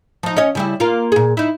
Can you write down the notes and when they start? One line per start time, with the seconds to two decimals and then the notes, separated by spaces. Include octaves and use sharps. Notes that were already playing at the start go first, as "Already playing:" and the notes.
0.23 F3 D#4
0.36 C#4 C#5 D#5
0.55 C#3 G3 E4
0.80 A#3 F4
1.12 A#2 G#4
1.37 D#4 E4